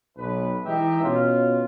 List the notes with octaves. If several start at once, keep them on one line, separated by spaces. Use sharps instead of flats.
B1 B4
E3 G#3 D#4 G4 E5
B2 C#4 F4